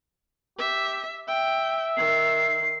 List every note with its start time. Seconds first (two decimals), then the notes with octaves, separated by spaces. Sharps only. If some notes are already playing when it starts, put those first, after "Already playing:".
0.59 G4 E5
1.28 E5 G5
1.97 D#3 C7